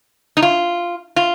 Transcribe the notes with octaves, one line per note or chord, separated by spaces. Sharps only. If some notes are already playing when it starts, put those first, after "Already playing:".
D#4
F4
F4